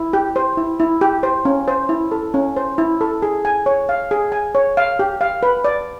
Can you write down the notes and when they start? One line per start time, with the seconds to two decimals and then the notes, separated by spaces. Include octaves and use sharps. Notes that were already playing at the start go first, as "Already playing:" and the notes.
Already playing: E4
0.13 G4
0.36 C5
0.57 E4
0.80 E4
1.01 G4
1.23 C5
1.45 C#4
1.68 C5
1.89 E4
2.11 A4
2.34 C#4
2.57 C5
2.78 E4
3.01 A4
3.22 G#4
3.45 G#5
3.66 C#5
3.89 F5
4.11 G#4
4.32 G#5
4.55 C#5
4.77 F5
4.99 G4
5.21 F5
5.43 B4
5.65 D5